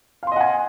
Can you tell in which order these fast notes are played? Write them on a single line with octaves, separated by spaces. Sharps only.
F5 C6 D#5 F#5 G#5